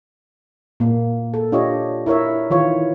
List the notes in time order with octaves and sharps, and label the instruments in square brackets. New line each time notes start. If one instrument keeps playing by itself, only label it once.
[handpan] A#2 A#3
A4
D4 F4 G4 C#5 D#5
E4 A#4 C#5 E5
D#3 E3 F4 C#5